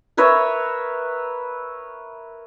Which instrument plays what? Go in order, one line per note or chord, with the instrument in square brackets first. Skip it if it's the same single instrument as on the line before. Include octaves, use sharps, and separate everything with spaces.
[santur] A#4 B4 C#5 E5